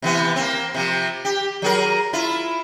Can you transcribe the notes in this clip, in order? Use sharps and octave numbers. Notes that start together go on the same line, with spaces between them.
C3 E3 B3
A#3 C4
C3 F3
G4
F#3 G#4 A#4
E4 F4